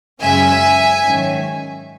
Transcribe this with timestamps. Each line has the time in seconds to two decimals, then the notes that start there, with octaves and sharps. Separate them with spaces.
0.21 F#2 C#3 G#3 C#4 E5 G#5
1.04 G#2 D#3 F#3 C#4